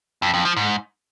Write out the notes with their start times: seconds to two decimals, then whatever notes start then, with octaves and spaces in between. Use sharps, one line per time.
0.22 F2
0.34 F2
0.45 F3
0.57 G#2